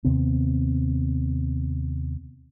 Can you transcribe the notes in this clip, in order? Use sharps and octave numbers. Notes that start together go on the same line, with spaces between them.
D#2 C3 B3 C4